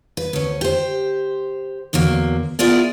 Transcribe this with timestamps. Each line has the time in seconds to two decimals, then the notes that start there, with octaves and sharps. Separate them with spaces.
0.17 B4
0.33 D2 C#4
0.61 G4 C5
1.93 E2 D3 F#3 A#3
2.59 B3 E4 F4 G#4 A#4 D5